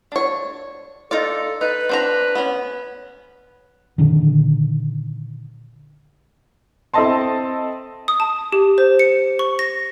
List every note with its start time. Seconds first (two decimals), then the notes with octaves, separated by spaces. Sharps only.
0.12 D4 C#5
1.11 D#4 F4 A4 D5
1.61 D#4 B4
1.89 C4 D4 A#5
2.35 B3 C#4
3.98 A#2 D3 D#3
6.94 C4 E4 A4 D#5 A5 C6
8.08 D#6
8.20 A5
8.52 G4
8.78 C5
8.99 C#7
9.39 C#6
9.59 A#6